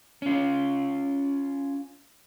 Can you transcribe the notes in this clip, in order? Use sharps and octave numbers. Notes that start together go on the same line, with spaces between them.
C#4 F4